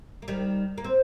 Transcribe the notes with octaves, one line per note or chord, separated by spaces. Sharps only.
A#3
D#3 G3
A#3
C4